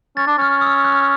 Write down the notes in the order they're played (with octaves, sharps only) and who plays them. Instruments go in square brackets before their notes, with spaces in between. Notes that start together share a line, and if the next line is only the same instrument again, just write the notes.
[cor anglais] C#4 [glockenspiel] A6
[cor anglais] D4
[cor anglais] C#4 [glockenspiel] F6
[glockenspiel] D#6
E6
F#6
F6